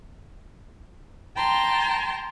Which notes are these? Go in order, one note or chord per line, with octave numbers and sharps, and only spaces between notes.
G5 A5 A#5 C6